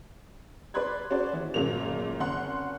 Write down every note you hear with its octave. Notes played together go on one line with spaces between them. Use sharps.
B4 D5 B5 C6 F#6 G#6
C#4 F#4 G#4 C5 D5
E3
G1 F#2 A#2 G#3 A#3 F7
F#1 C4 F#5 C6 F#6